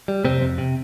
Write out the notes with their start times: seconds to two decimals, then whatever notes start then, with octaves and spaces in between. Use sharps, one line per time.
0.08 G3
0.25 F2 C3 C4
0.42 F2
0.58 C3